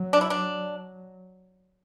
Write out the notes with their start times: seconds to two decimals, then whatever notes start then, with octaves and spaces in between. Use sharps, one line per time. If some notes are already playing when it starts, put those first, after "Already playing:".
Already playing: F#3
0.13 D4
0.21 E4
0.30 D4